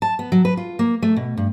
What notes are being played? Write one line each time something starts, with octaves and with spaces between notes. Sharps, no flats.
A5
B3
F#3
B4
F4
A#3
A3
B2
G2